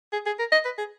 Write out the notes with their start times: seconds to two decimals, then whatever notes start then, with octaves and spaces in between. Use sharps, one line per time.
0.13 G#4
0.26 G#4
0.39 A#4
0.52 D#5
0.65 B4
0.78 G#4